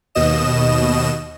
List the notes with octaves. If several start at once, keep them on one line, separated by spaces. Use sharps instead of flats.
D#2 B2 D#5 E7